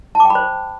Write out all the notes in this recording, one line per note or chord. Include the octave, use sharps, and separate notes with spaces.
A5
D6
G5
B5
C5